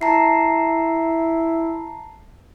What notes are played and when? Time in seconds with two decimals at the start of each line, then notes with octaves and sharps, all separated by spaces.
0.01 E4 A5 A#5 C7